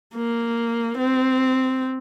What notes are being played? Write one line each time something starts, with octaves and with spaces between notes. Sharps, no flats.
A#3
C4